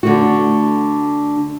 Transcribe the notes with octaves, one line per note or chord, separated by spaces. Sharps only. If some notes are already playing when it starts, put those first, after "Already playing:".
D3 A3 F#4